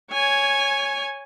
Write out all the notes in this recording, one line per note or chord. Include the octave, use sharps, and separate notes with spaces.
C#5 G#5